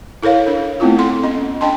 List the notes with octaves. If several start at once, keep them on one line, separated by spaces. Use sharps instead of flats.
E4 A4 A#4 C#5 F5
D4 A#4
A3 B3 C4 E4 F4
A4 F#5 C6
C#4 D#5
D4 D#5 G5 A5 C6